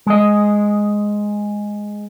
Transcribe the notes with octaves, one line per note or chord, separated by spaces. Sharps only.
G#3 D#5